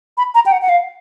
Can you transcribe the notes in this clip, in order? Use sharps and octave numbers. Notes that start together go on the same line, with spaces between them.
B5
A#5
G5
F#5
F#5
F5